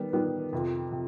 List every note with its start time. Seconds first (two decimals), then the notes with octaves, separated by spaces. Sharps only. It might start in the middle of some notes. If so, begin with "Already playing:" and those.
Already playing: D#3 G3 B3
0.13 D#3 G3 B3
0.53 F2 C3 F3
0.92 C3